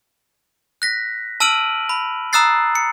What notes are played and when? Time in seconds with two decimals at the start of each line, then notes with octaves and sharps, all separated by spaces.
0.82 F#6 A#6 B6
1.40 A5 E6 F6 D7 D#7 F#7
1.89 B5
2.33 A#5 D#6 E6 F#6 A6 C7
2.75 C#7